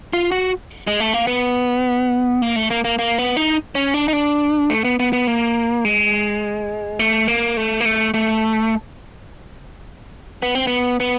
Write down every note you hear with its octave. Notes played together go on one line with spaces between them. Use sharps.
F4
F#4
G#3
A3
A#3
B3
A#3
A3
A#3
A#3
A#3
B3
D#4
C#4
D4
D#4
D4
A3
B3
B3
B3
A#3
G#3
A3
A#3
A3
A#3
A3
A3
B3
C4
B3
B3